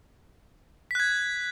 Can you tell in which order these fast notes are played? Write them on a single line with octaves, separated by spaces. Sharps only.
B6 F#6 G#6